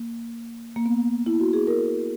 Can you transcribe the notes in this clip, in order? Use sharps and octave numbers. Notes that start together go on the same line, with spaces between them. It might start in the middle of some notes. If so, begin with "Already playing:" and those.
Already playing: A#3
A#3
B3
E4
F#4
G#4
A#4